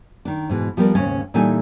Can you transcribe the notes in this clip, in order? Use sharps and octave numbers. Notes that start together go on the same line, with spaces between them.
D#3 D4
G#2 B2 E3
F3 G3 B3 G#4 A#4 D5
D#2 G#2 C#3 C#4
A#2 E3 G3 D#4 A4 G#5